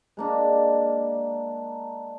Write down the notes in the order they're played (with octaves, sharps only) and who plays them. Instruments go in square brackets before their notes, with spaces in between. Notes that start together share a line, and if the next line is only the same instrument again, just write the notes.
[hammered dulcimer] G#3 A#3 D4